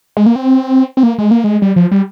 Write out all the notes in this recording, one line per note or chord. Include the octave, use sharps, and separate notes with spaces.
G#3
A#3
C4
C4
A#3
G#3
A#3
G#3
G3
F3
G3